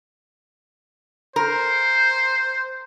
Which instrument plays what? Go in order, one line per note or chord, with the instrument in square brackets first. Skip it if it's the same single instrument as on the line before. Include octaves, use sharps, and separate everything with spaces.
[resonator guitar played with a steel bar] A#4 [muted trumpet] C5